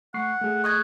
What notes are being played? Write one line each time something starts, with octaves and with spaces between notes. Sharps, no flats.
A3 F#5 C#6 C7
A3 G#4
D#5 C#6 F#6 G#6